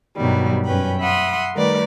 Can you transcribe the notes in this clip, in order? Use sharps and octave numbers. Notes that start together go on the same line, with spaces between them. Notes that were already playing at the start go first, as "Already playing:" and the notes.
G2 B2 D#3 F#3 G3
F#2 C#4 B4 G5 B5
E5 F#5 B5 C6 D#6
D#3 G3 A3 A#4 B4 D5